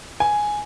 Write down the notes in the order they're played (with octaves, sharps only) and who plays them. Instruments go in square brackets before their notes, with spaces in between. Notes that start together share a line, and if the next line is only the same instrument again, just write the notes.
[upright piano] G#5